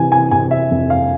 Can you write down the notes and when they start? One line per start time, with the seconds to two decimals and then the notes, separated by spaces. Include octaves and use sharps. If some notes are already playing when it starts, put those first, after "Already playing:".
Already playing: C3 E3 G#5
0.12 G#5
0.31 C3 G#5
0.51 E5
0.71 F2
0.90 F5